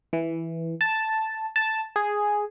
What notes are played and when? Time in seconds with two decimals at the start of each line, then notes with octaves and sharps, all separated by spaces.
0.13 E3
0.81 A5
1.56 A5
1.96 G#4